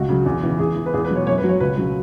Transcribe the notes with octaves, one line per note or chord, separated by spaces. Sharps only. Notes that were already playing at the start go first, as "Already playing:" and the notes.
Already playing: C#2 F#4
C#3 F#3
E2
C#3 E3
E2 G#4
E3
B4
E2 G#4
B4
B2 F#3 C#5
F#2 C#5
B4
F#3
C#5
C#2 B4
C#3 F#3